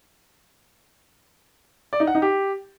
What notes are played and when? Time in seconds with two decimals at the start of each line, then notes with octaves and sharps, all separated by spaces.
1.93 D5
2.00 D#4
2.07 F#5
2.15 D#4
2.22 G4